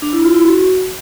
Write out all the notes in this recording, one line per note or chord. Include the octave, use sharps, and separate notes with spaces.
D4
E4
F4
E4
F#4